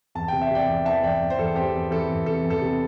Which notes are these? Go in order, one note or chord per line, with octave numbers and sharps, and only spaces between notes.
E2 A5
C3 G5
E5
C3 D5 G5
E2
E3 E5 A5
E2 D5 G5
E2
C5
E2 A4
E2 G4 C5
E2
E3 A4
E2
C3 A4
E2
A4
C3